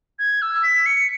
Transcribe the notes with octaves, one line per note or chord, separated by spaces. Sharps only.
G#6
E6
B6
C#7